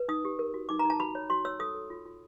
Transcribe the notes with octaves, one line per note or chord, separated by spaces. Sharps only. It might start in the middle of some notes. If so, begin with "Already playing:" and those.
Already playing: B4
D#4 D#6
G4
A#4
F#4
D#4 D6
A#5
D#4
A5
F#4 B5
C#5
F#4 C6
C#5 E6
A4 D#6
A4
F4
F4